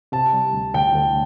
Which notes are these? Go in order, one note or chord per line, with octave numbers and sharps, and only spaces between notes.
C3 A5
G3
D2
D2 G5
D2